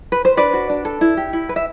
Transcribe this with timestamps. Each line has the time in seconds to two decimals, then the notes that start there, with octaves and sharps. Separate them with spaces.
0.12 B4
0.25 C5
0.37 D4 B4 D5
0.53 F#4
0.70 D4
0.85 A4
1.01 E4
1.17 G4
1.33 E4
1.49 B4
1.56 E5